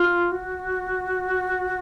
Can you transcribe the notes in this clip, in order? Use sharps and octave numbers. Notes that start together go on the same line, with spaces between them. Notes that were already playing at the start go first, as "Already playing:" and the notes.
Already playing: F4
F#4